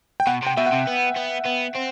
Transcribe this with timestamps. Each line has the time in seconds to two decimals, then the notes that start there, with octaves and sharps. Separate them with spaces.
0.20 G5
0.27 B2 F#5
0.42 C3 G5
0.57 B2 E5
0.66 F#5
0.72 C3
0.87 B3
1.16 B3
1.46 B3
1.75 C4